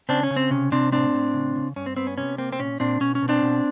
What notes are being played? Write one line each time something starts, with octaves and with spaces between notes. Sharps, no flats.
C#3 C4 D4
C#4
C#3
C4
C3 C#4
C3 C4 D4
A2 C4 D4
A2
C#3
C#3
G2 C#4
C4
B3 C4
C#4
C3 C#4
A#3 C4
C4
A#2 C#4
A#2 C4 D4
B2 C#4
C#4
B2
C4 D4
B2